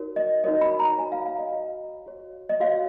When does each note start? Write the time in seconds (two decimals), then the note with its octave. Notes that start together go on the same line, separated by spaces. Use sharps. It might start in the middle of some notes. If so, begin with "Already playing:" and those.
Already playing: D#4 F#4 A#4 C#5
0.16 D#5
0.44 D#4 F#4 A#4 C#5 D#5
0.61 B5
0.79 A#5
0.98 F#4 C#5 G#5
1.12 F5
1.26 F5
1.38 D#5
1.52 F#4 C#5
2.06 F#4 C#5
2.49 D#5
2.60 F#4 C#5 F5